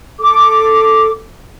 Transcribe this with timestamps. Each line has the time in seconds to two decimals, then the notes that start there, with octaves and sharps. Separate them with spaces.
0.19 A4 D6